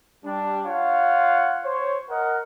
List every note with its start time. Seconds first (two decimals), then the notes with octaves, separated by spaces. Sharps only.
0.24 G3 D4
0.66 F4 C#5 F5 F#5
1.64 C5 C#5
2.09 A#4 D#5 F#5